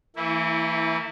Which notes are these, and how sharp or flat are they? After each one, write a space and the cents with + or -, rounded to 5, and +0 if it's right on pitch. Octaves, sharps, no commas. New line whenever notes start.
E3 +0 A#3 -45 E4 -20